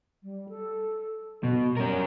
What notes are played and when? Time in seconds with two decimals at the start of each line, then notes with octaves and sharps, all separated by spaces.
0.23 G3
0.49 A4
1.43 B2 F#4
1.77 G3 C#4 A#4